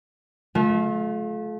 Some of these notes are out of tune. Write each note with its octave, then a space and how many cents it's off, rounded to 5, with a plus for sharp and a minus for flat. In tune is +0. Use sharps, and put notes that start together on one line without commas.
A3 -35 F4 +15